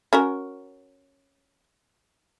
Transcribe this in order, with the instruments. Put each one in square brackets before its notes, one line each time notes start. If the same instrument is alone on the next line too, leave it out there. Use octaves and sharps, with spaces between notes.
[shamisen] C#4 F#4 A#4